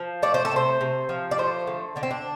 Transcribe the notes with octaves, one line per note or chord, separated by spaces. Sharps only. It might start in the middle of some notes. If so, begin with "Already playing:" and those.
Already playing: F3
A3 D5
C5
A4
C3 C5
C3
F3
D5
A3 C5
D3
D3 D4
C4
D4